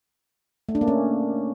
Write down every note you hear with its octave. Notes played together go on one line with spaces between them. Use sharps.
A3
D4
A#3
C#4